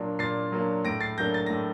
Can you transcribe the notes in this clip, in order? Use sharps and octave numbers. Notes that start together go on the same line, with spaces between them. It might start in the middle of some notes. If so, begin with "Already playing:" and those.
Already playing: A#2 F#3 A#3 D4
A#2 A6 C7
F#3 A#3 D4
A2 A#6 D7
A6 C7
F#3 A#3 D4 G6 A#6
A6
A2 A#6